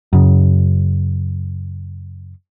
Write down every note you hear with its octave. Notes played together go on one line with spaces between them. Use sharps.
F#2 C#3